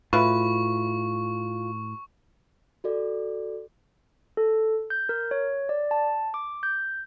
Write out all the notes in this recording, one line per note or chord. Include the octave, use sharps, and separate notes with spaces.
A2 F#3 E4 F4 B4 C#6
F#4 A4 D5
A4
G6
A#4
C#5
D5
A5
D6
G6